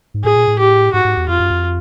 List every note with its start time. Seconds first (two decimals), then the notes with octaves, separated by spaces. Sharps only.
0.14 G#2
0.24 A2 G#4
0.35 A#2
0.48 A2
0.59 G4
0.93 G#2 F#4
1.05 G#2
1.17 E2
1.28 F2 F4
1.40 F#2
1.50 F2